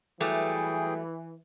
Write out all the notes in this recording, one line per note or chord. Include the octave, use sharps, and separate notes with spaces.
E3 F#3 G3 A3 G#4 G5